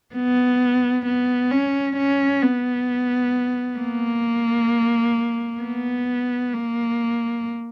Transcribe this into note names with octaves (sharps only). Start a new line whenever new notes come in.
B3
B3
C#4
C#4
B3
A#3
B3
A#3